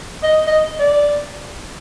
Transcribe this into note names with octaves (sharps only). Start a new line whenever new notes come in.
D#5
D#5
D5